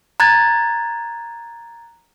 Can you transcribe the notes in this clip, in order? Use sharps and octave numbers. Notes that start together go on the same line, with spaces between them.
A#5 F#6 G#6 A6